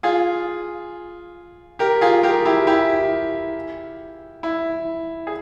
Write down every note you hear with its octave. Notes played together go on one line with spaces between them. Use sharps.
F4 G#4
G4 A#4
F4 G#4
G4 A#4
E4 G4
E4 G4
E4
G#4